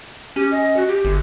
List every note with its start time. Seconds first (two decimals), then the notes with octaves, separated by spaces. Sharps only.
0.36 C#4 G4
0.52 D#5
0.77 F#4
0.88 G4
1.05 G1